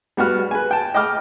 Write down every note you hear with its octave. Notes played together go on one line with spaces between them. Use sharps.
G3 B3 F#4 F6
B4 G#5
G5 A5
D#5 G5 D6 F6